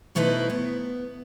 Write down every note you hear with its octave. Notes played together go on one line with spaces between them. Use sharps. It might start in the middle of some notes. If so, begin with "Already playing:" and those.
B2 A3 D#4 E4 B4 C5
B3